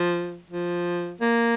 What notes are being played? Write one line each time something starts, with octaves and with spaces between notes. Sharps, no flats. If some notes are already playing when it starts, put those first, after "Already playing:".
Already playing: F3
F3
A#3